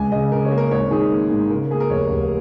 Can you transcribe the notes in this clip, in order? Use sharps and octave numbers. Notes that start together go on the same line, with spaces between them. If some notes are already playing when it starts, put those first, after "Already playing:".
Already playing: C#2 G#5
C#3 D#5
C#3 A#4
C#5
A#3
A#4
G#1 C#5
D#3 G#4
A#3
G#2
C#3 A#4
A#3 G#4
A#4
F1 C#5
F1